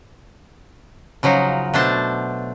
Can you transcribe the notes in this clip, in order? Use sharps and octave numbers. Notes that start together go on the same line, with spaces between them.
C#3 F3 F#3 D#4
B2 A3 D4 C5 A5